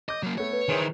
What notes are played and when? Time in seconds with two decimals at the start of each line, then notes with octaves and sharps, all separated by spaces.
0.09 D#5 D6 G6
0.23 F#3 A#3
0.38 A3 B3 C#5
0.53 B4
0.69 D#3 E3 G#4 C5